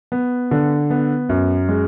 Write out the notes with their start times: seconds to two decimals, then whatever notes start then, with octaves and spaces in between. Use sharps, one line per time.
0.12 B3
0.51 D3
0.90 B3
1.29 F#2
1.69 G#3